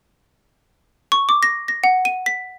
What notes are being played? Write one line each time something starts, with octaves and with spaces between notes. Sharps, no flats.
C#6
D6
A#6
A#6
F#5
D#7
B6